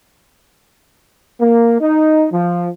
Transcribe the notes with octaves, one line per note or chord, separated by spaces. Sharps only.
A#3
D#4
F3